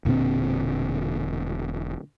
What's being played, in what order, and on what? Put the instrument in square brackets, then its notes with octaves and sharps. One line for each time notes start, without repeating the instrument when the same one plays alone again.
[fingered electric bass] E1 A#2 D3 C4